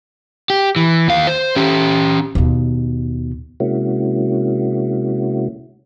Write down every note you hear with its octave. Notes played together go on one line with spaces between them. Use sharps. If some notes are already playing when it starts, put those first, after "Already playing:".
G4
E3
D#2 F5
C5
C#4 G4
D#2 B2
C3 G#3 A#3 C#4 E4 F#4